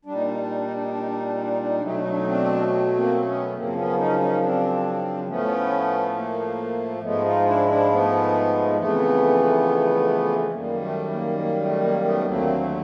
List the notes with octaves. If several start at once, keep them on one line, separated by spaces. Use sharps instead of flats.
A#2 G3 D4
D#4
D4
D#4
D4
D#4
D4
D#4
D4
D#4
D4
D#4
D4
D#4
D4
D#4
D4
D#4
D4
D#4
D4
B2 F#3 A3 D#4
D4
D#4
D4
D#4
C4 D4
A#3 C4
B3 C#4
F#2 C#3 F3 A#3 C4
B3 C#4
C#4 D#4
C#4 D#4
C4 D4
A2 F3 A3 B3 C#4
A#3
G#2 F3 G#3 A3 B3
D#4 F4
D4 E4
D4 E4
A3 B3
F2 C#3 E3 A3 B3
F#2 D#3 G3 A#3
A3
A#3
A#3
A3
A#3
A3 B3
D#2 D3 F#3 A3 A#3 C4